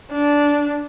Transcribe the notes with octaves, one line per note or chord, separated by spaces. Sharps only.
D4